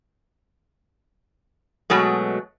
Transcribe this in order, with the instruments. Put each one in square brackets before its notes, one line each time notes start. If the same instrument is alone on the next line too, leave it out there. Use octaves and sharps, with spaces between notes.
[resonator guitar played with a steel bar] B2 F#3 G#3 A3